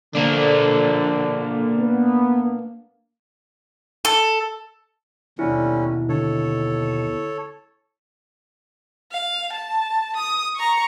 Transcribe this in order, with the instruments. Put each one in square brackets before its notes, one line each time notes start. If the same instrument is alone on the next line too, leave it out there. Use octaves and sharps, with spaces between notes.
[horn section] D3 [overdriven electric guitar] A#3 D4
[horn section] B3
[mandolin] A4
[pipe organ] D#2 B2 [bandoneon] D3 G3 C#4 [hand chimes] E4
[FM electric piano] D3 [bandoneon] A4 C#5
[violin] F5
A5
D#6
A#5 C#6